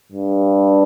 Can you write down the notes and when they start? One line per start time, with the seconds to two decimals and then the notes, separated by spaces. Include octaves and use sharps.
0.12 G2